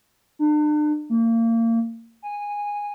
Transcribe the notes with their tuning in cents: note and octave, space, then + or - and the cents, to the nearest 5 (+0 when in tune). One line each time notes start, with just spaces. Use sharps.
D4 +40
A#3 -30
G#5 -15